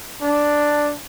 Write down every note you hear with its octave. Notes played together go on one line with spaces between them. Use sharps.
D4